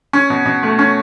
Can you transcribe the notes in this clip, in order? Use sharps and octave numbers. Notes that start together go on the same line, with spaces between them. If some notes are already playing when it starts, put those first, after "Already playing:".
C#4
B2
B2
A3
C#4